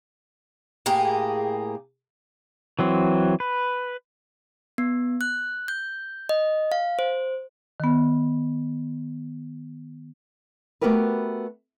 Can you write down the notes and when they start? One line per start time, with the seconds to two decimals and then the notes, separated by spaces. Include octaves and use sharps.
0.86 A2 A#3 G4 G#4
2.79 E3 F#3 C4
3.40 B4
4.78 B3
5.21 F#6
5.68 G6
6.29 D#5
6.72 F5
6.99 C5
7.80 D#3 B3
10.81 A3 B3 F#4 G4 A#4 B4